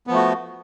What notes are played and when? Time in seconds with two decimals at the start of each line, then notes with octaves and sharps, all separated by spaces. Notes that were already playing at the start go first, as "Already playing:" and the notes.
0.07 B3
0.10 F3
0.13 A3
0.16 F#4